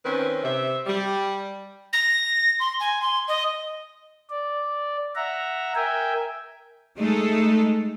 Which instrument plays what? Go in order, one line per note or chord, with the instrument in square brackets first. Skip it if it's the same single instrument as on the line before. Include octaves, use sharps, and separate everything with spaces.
[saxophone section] D#3 C4 C#4 B4
C3 E5
G3
[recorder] A#6
C6
G#5
C6
D#5
[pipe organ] D5
E5 F#5 A#5
A#4 E5 G5 G#5
[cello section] G#3 A3 D#4 A4